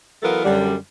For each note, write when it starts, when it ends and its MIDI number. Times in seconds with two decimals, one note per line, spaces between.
0.23 0.43 52
0.23 0.43 54
0.23 0.43 59
0.23 0.43 65
0.23 0.43 69
0.23 0.43 70
0.45 0.75 42
0.45 0.75 50
0.45 0.75 55